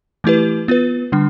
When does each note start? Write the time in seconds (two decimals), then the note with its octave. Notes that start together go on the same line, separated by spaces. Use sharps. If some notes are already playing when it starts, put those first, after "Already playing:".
0.24 E3 A3 E4 G4 B4
0.68 B3 F4 B4
1.12 D3 G3 D4